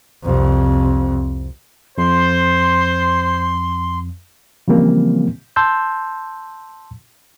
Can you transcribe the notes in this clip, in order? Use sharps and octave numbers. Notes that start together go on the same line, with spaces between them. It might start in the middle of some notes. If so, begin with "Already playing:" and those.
C2 F2
F2 C5 C6
C#3 E3 F3 G3 A#3 C4
A5 C6 E6 G6